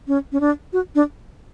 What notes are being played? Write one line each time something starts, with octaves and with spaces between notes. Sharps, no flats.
C#4
C#4
D4
F#4
D4